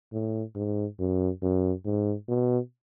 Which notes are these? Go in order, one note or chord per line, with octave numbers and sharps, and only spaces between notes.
A2
G#2
F#2
F#2
G#2
B2